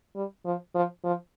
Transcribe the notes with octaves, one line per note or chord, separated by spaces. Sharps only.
G3
F3
F3
F3